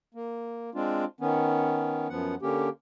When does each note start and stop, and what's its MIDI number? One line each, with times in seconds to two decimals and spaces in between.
0.14 0.70 58
0.75 1.05 56
0.75 1.05 60
0.75 1.05 62
0.75 1.05 65
1.20 2.08 51
1.20 2.08 59
1.20 2.08 61
2.10 2.35 42
2.10 2.35 53
2.10 2.35 59
2.10 2.35 78
2.42 2.69 50
2.42 2.69 58
2.42 2.69 61
2.42 2.69 67